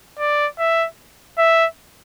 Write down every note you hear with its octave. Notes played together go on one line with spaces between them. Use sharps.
D5
E5
E5